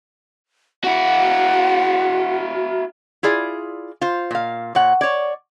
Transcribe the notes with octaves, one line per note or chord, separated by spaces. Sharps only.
E4 F#4 F#5
E4 F4 G#4 D5
F4 C5
A#2 F5
A#2 C#5 F#5
C#5 D5